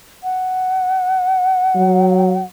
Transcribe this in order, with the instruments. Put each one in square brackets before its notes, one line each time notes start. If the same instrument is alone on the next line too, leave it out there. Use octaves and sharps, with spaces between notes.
[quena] F#5
[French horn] F#3